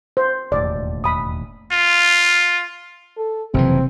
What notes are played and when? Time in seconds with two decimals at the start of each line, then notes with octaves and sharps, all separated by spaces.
0.17 C5
0.52 E1 D#2 A2 D5
1.04 B5 D#6
1.72 F4
3.17 A4
3.54 F#1 F2 C3 E3 C4